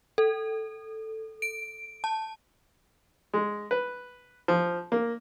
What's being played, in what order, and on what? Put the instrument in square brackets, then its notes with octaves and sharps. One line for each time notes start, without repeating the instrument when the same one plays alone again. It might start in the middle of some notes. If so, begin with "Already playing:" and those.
[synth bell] A4
D7
A5
[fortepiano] G#3
B4
F3
A#3